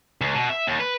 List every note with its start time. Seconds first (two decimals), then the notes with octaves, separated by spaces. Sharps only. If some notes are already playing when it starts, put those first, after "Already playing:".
0.21 C#2
0.35 B2
0.50 E5
0.67 D#2
0.79 B4